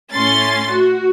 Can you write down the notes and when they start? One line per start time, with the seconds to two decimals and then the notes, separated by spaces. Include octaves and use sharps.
0.12 A2 C#4 C6 A6
0.72 F#4